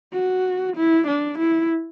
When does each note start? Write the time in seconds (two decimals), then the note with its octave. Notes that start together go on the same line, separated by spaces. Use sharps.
0.14 F#4
0.77 E4
1.07 D4
1.39 E4